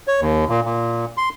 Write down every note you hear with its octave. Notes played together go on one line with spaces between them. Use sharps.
C#5
D#2
A#2
A#2
C6